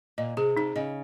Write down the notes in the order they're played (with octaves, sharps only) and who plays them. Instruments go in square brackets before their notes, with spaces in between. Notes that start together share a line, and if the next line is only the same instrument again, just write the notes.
[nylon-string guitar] A#2 [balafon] D#5
[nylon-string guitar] C3 [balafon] G#4
[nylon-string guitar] C3 [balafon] D#4
[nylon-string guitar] C#3 [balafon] D#5